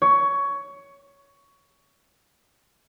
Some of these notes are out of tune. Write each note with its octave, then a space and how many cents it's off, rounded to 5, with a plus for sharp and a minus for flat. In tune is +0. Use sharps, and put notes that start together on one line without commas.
C#5 +15